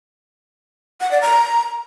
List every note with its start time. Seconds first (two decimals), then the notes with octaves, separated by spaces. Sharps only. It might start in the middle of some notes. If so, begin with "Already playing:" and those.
1.01 F#5
1.11 D5
1.22 A#5